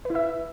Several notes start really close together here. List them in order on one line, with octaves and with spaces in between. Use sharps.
B4 E4 E5